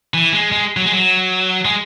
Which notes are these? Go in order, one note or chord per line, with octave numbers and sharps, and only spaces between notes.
E3
G#3
G#3
F#3
G#3
F#3
G#3